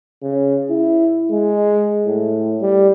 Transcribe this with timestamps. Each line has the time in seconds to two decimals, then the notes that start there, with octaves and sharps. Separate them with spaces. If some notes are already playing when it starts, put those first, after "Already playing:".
0.23 C#3
0.70 E4
1.31 G#3
2.07 A2
2.61 G3